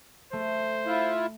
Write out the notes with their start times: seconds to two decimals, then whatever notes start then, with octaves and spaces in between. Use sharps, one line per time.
0.33 A3 C5
0.87 E4 F4